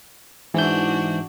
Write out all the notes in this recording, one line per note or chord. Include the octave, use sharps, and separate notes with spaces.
G#2 E3 D4 F#4 G6